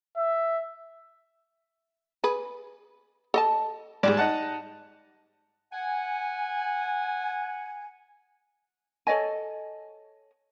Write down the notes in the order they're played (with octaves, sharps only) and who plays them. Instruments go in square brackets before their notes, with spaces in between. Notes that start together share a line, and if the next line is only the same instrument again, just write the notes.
[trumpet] E5
[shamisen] G#4 B4
A4 D#5 A5
[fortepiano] G#2 G3 [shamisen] G#4 D5
[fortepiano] D#4 F#5 A5
[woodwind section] F#5 G#5
[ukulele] A4 C#5 D#5 G#5